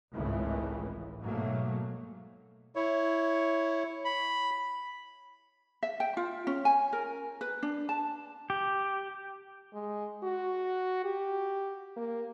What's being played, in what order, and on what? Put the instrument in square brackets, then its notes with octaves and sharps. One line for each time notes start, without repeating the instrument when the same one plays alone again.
[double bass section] G#1 C#2 A2 E3
G#2 B2 F#3 A3 A#3
[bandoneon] E4 C#5
B5
[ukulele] E5
G5
F4
C#4
G#5
A#4
B4
D4
A5
[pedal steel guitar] G4
[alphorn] G#3
F#4
G4
A#3